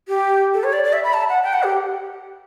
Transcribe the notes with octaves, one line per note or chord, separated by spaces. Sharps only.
G4
A4
C#5
D5
D5
E5
B5
A5
F#5
G5
F#5
G4